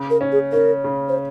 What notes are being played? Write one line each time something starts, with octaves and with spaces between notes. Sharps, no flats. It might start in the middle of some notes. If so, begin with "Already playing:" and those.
Already playing: C#3
A#4
C#4
G#4
C#4 A#4
C#3
C5